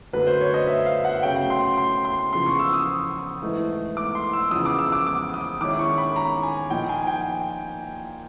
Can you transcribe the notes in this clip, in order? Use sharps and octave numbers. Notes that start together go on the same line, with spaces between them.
F#2 D3 F#3 A3 B4
C5
C#5
D#5
E5
F5
F#5
C#3 F#3 A3 C#4 G5
C6
C6
C6
E2 C#3 F3 C6
C#6
E6
D#6
G#2 E3 A3
D6
C6
E6
E2 C#3 F3 G#3 D#6
D6
E6
D6
D6
D#6
D#3 G#3 C#4 E4 D6
C#6
B5
A#5
G#5
A#2 F3 A#3 D#4 G5
G#5
G5